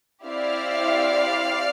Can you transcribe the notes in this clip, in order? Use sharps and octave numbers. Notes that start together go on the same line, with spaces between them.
C4 E4 G4 D5 F5